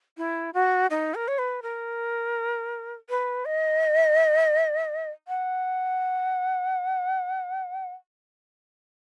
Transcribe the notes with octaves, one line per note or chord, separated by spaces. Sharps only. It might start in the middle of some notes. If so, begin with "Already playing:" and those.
E4
F#4
D#4
A#4
C#5
B4
A#4
B4
D#5
F#5